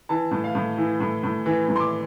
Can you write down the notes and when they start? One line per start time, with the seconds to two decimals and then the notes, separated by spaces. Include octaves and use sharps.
0.09 E3 A5
0.31 A2
0.44 F5
0.55 A2
0.78 E3
1.00 A2
1.23 A2
1.46 E3
1.69 A2
1.76 C6
1.80 D6